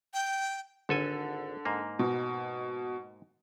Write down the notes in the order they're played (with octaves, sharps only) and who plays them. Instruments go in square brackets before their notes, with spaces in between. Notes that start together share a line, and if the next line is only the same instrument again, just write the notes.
[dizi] G5
[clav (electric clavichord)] G#1 A4 G#5 [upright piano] D3
[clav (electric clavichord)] G#2 A#3
[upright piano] B2